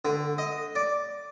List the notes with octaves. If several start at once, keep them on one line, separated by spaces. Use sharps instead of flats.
D3
D#5
D5